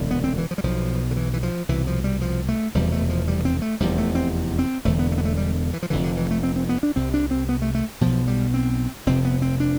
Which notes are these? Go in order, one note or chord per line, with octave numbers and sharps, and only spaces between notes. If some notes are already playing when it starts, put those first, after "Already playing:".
Already playing: E1 D2 C3
B3
C4
E3
F3
G3
B1 B2 F3
D3
E3
E3
F3
C2 B2 E3
F3
G3
F3
A3
F1 E2 B2 G3
A3
F3
G3
C4
A3
F1 E2 C3 G3
A3
C4
C4
E1 E2 D3 A3
B3
A3
B3
A3
G3
E3
F3
F1 F2 D3 E3
D3
E3
A3
C4
C4
B3
D4
C2 C3 C4
D4
C4
B3
A3
A3
B1 B2 F3
G3
C4
F1 F2 C3 C4
B3
C4
D4